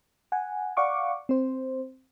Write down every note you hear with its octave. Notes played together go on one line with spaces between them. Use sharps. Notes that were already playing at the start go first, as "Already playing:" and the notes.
F#5 G#5
D5 F5 F#5 C#6 D6
C4 C5